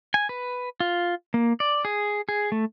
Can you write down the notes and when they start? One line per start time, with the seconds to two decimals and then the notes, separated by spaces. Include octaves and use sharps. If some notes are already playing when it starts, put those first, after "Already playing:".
0.14 G#5
0.29 B4
0.80 F4
1.34 A#3
1.60 D5
1.85 G#4
2.29 G#4
2.52 A3